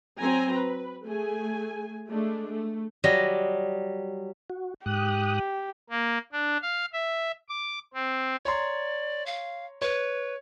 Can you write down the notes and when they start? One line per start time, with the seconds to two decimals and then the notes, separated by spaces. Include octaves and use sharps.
0.20 F#3 C4 G#5 A#5
0.53 B4
1.05 A3 G#4 G#5
2.08 G#3 A3 D4
2.51 A3
3.04 F#3 G3 D#5
4.50 F#4
4.86 G#2 G4 D#6 F#6
5.90 A#3
6.32 D4
6.62 F5
6.93 E5
7.49 D6
7.94 C4
8.45 C#5 D5 A#5 C6
9.26 F5
9.82 B4 C#5